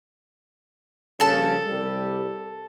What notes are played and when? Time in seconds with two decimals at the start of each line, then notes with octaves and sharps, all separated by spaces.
1.20 A#1 G2 C#3 A4 A5
1.66 C2 G3